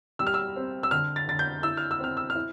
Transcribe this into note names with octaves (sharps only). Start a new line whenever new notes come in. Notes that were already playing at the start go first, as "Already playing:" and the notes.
G3 E6
F6
E6
C4
E6
D3 F6
A6
D3 A6
G6
E4 E6
F6
E6
C4 F6
E6
F6
E4